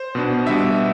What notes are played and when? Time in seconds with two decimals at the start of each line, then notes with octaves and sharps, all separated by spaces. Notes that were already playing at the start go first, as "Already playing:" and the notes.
Already playing: C5
0.15 B2 B3 D4
0.46 B2 G3 B3 D4 E5